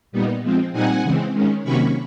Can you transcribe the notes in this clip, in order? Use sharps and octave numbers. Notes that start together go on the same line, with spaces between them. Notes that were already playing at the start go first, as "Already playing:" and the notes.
A#2 G3 B3 D#4
F3 G#3 C4
A#2 G3 C4 D#4 F#5 G#5
C#3 E3 G#3 C4
D#3 G#3 C#4
C3 D#3 F#3 A#3 C#4 B5 C#6